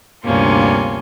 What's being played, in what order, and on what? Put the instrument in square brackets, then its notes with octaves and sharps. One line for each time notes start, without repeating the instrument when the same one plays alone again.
[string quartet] D2 G2 C3 A#3 C#4 F4